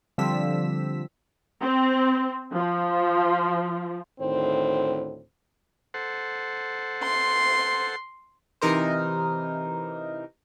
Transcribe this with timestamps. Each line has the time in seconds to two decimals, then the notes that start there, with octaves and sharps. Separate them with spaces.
0.18 D3 F3 G3 C4 E6 B6
1.62 C4
2.52 F3
4.20 D2 A2 D#3 C4 C5
5.94 A4 C5 F#5
7.02 C6
8.61 C3 E3 D#4 A#4 C5